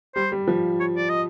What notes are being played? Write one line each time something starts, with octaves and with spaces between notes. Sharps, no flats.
G3 C5
G3
F3
C#5
D5
D#5